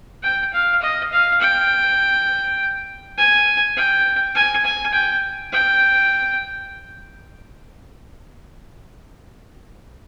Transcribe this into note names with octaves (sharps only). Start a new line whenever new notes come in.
G5
F5
D#5
F5
G5
G#5
G5
G#5
G#5
G5
G5